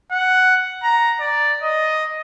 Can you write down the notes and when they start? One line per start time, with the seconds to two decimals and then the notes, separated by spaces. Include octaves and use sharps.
0.11 F#5
0.83 A#5
1.20 D5
1.62 D#5